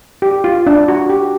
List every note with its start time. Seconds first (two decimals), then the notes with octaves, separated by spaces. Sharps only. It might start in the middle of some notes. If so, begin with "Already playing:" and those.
0.22 G4
0.44 F4
0.67 D4
0.88 F#4
1.09 G4